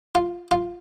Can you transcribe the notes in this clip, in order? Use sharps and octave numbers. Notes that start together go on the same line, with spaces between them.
F4
F4